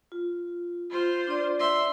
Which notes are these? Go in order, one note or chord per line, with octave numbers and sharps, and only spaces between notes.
F4
F4 C5
D4 D5
E5 C6